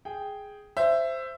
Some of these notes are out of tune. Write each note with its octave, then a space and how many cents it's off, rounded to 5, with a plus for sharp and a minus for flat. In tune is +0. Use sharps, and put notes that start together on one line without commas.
G#4 +0 G5 +0
C5 +0 E5 +15